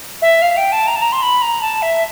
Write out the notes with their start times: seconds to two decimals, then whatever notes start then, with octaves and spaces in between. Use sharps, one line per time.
0.22 E5
0.42 F5
0.57 G5
0.72 A5
0.87 A#5
0.96 A5
1.02 A#5
1.12 C6
1.22 B5
1.42 A#5
1.62 A5
1.82 E5